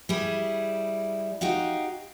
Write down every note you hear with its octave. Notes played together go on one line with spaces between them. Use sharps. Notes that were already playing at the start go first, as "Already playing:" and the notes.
G3 E4 G#4
D#4 F#4 G4 F5